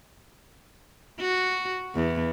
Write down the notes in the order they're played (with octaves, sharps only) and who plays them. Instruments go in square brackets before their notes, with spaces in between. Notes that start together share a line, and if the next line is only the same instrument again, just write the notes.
[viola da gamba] F#4
E2